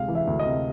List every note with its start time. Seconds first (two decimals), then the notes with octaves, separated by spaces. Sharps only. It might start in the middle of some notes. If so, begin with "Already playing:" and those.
Already playing: D2 C3 G#3 F5
0.08 E3
0.15 E5
0.27 D2
0.39 D#5
0.46 C3